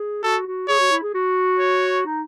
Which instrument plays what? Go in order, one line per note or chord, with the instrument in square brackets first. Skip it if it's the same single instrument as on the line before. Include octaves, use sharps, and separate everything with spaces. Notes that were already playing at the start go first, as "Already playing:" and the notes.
Already playing: [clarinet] G#4
[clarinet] F#4 [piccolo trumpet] A4
[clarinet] F#4
[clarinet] G#4 [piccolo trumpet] C#5
[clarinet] F#4
E4
G#4
F#4
[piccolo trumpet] C#5
[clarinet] D#4